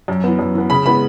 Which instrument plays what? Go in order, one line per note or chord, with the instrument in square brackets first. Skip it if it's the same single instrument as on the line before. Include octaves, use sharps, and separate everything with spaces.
[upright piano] F#2
E3 B3
F#2
E3 B3
C#3 B5
E3 G#3 B3 B5